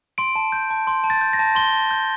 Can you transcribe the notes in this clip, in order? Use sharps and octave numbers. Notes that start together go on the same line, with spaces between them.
C6 D7
A5
G6
A5
C6
A5
A6
G6
A#6
A5
C6 G7
A5
G6